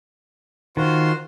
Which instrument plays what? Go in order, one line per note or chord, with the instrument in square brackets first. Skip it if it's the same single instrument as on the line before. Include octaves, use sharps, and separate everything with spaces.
[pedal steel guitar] D#3 [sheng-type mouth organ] F4 F#4 C5